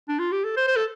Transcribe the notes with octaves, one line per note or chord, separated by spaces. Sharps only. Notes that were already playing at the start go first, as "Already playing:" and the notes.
D4
F4
G4
A4
C5
C5
A4